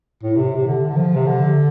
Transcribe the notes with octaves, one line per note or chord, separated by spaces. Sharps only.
A2
C3
C3
D3
D3
F3
C3
D3